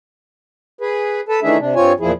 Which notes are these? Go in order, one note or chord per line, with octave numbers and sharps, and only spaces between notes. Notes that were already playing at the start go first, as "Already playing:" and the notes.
G#4 B4
A4 B4 A5
D#3 E3 A3 D4 G#4 E5
C3 D4
G2 C4 F4 C#5 G#5
E2 A#2 F3 E4 G#4